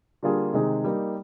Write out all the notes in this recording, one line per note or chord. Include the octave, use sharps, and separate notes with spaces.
D3 G3 A#3 F4 G#4
C3 D#3 G#3 D#4 G#4
G3 A#3 D#4